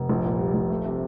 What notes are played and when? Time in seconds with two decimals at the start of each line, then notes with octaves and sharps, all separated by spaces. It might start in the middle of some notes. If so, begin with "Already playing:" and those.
Already playing: F1
0.10 A#1
0.25 A#2
0.39 G3
0.54 A#1
0.70 A3
0.85 C3